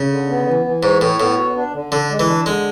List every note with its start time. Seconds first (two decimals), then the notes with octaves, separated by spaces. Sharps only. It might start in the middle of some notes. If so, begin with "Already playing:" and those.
Already playing: C#3
0.11 D3
0.28 B3
0.47 E3
0.66 E3
0.83 G#2 C#5
1.01 A2 C#5
1.19 A2 B3
1.38 F#4
1.56 D4
1.74 D3
1.91 D3 D4
2.11 G#3
2.19 E3
2.28 D4
2.46 D3 G#3